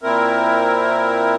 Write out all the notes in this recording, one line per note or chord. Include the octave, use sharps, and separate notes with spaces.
A#2 C4 E4 A#4